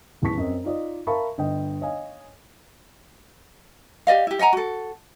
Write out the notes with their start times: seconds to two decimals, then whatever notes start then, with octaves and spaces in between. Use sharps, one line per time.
0.22 D#1 E2 E4 A5 C#6 B6
0.37 F#2 C4 D#5
0.64 D#4 F4 D5 D#5
1.07 A#4 E5 F5 A5 B5 C#6
1.38 G1 D#5 G5
1.81 C#5 D#5 F5 G#5
4.07 G4 D5 D#5 F5
4.27 E4 G4
4.39 D#5 F#5 G#5 A#5
4.53 F#4 A4